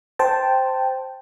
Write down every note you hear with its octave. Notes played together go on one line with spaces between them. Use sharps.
C5 G5 A5